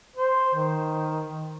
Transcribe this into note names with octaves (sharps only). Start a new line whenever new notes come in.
C5
D#3